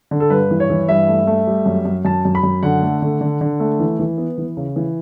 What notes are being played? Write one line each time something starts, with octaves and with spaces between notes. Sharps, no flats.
D3
A4
G2 B4
E3
C#5
E3
G2 E5
A3
A3
G3
F#2
F#2
F#2 A5
F#2
B5
F#2
D3 F#5
A3
D3
D3
D3
A3
E3
E3
B3
E3
C#3
E3